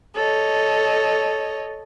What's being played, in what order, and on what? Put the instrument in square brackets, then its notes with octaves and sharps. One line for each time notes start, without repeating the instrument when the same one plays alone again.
[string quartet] A4 C#5 D#5